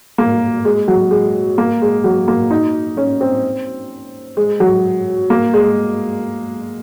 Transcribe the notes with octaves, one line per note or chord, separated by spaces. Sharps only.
A#3
G#3
F#3
G#3
A#3
G#3
F#3
A#3
D#4
C#4
C4
G#3
F#3
A#3
G#3